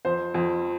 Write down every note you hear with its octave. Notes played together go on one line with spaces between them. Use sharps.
F2 C5
F2